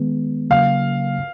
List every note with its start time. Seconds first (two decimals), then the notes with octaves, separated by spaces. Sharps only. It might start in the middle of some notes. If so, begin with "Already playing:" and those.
Already playing: D#3 G#3 B3
0.50 C#3 F#3 A#3 F5